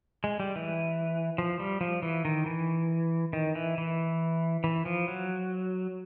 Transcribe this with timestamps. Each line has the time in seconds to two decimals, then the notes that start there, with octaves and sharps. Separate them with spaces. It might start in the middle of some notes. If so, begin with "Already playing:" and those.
0.24 G#3
0.40 G3
0.56 E3
1.38 F3
1.60 G3
1.81 F3
2.02 E3
2.25 D#3
2.46 E3
3.33 D#3
3.55 E3
3.78 E3
4.64 E3
4.86 F3
5.08 F#3